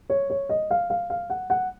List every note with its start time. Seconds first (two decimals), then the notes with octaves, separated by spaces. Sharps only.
0.10 C#5
0.30 C#5
0.49 D#5
0.71 F5
0.90 F5
1.10 F5
1.30 F#5
1.50 F#5